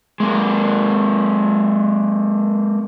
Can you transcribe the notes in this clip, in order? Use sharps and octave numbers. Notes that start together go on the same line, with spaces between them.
G#3 A#3